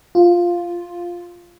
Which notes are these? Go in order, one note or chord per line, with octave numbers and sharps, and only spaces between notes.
F4